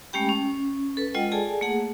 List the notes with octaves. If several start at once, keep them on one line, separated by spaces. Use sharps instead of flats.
G#3 A3 C#4 G4 G5 B5
C#4
A4 B4
G#3 F4 D#5 F#5 G5
G#4 A4 D5 G#5 A5
A3 A#3 G#4 F#5